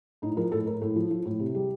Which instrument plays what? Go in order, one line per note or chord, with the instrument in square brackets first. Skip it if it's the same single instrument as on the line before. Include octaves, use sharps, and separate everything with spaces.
[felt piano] A2 D#4
F3 A#4
A2 A4
A2 A#4
A2 A4
F3
F3
A2
C3
G3